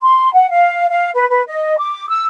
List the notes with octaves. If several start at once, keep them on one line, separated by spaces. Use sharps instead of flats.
C6
F#5
F5
F5
B4
B4
D#5
D6
E6